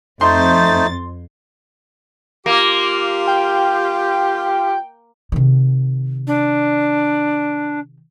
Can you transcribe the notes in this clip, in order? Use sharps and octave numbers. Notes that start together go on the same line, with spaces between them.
F2 A3 D#4 C5 C6 A6
A#3 F4 G4
G5
C3 D#3
D4